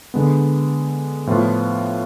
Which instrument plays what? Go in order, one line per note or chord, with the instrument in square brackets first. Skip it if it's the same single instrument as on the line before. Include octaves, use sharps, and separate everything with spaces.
[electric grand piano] D3 G#3 B3
A2 F3 B3 F4